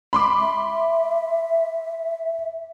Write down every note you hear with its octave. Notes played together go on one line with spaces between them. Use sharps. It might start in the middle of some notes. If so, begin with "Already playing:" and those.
B5 C6 D6
E5